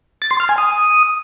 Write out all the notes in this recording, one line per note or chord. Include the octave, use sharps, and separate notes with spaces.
A6
C6
F6
G#5
D#6